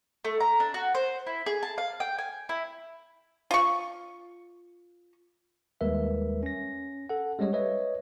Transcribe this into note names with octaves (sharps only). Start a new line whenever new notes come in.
A3
A#5
D4
F#4
C5
E4
G#4
A5
F5
G5
G#5
E4
F4 C#6
D#2 G3 G#3 A#4 B4 E5
C#4 A#6
A4 F#5
G3 G#3 C#4 G4 C#5 D#5
B4 C#5 D#5 E5